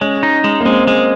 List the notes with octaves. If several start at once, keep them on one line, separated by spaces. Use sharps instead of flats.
G#3 C#4
D#4
G#3
A#3
G#3 C4
G#3